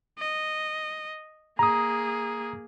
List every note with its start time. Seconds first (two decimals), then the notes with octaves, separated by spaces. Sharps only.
0.19 D#5
1.59 A#3 G#4 A#5 D#6